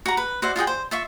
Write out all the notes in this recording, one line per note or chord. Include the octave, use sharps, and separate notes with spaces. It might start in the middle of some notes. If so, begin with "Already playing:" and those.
F#4 A#5
B4
F#4 C5 D5 E5
F4 F#4 G#4 G5
C5
F4 E5 C#6